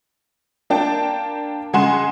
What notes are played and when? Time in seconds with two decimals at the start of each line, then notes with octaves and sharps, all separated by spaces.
0.70 A#3 D4 G5 A5
1.73 C#3 G#3 F#5 G#5 C6 E7